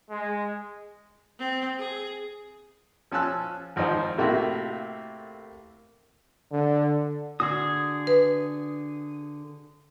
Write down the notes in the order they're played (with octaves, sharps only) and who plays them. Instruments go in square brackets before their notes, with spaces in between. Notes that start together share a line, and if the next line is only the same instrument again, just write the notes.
[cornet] G#3
[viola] C4
G#4
[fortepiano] F3 C#4 A5 E6 F#6
G#1 F3 D#4 C5
A2 C3 A3 A#3 F#4
[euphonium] D3
[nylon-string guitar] D3 F#4 [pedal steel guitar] G#4 D#6
[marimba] B4